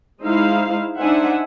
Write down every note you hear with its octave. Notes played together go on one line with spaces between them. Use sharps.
G#3 D#4 E4 C5 F5
D4 D#4 C5 E5 F#5 G#5